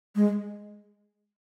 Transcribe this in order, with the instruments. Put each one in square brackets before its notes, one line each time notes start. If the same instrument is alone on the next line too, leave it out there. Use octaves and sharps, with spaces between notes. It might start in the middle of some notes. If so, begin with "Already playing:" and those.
[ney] G#3